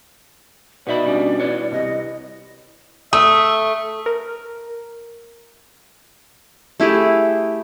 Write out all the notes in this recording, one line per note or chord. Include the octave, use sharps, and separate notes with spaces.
B2 B3 D#4 D5 E5 B5 F#7
G3 C#4 D4
E4 B4 C#5
C2 D#5
A3 E5 D#6
A#4
A3 E4 G4 G#4